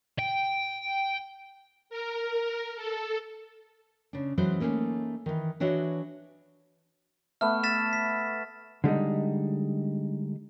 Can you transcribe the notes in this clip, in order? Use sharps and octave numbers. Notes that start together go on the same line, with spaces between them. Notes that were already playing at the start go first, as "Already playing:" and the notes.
G5
A#4
A4
C#3 D4
E3 F#3 G#3 C#4 F#4 C5
A3 A#3 C#4 D#4 G#4
D#3 E3
E3 D4 F#4 C#5 D#5 E5
A3 B3 F6
A6 B6 E7
B6
D3 G3 G#3 D#4